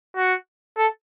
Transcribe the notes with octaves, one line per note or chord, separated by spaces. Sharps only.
F#4
A4